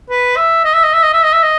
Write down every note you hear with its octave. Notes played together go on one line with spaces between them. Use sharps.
B4
E5
D#5
E5
D#5
E5
D#5
E5
D#5
E5
D#5